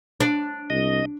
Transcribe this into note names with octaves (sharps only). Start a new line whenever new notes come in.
D4
C2 D#5